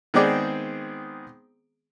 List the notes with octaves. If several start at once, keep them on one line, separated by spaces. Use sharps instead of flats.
D#3 G#3 B3 C4 G#4 D5